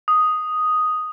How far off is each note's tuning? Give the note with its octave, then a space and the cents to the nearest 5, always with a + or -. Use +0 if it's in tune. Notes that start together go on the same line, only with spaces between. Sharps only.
D#6 +0